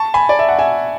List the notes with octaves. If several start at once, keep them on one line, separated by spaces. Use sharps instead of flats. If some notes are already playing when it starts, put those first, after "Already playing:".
Already playing: A5 C#6
G#5 B5
D5
E5
F#5
E5 G#5